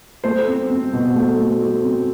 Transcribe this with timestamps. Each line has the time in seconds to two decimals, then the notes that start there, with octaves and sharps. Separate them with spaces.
0.24 A3 C5
0.48 C4
0.70 C4
0.93 B2
1.15 A3
1.39 A3
1.62 A3
1.84 C4